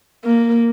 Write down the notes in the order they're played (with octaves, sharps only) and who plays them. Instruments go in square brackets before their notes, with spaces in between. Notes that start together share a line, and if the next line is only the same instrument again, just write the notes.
[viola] A#3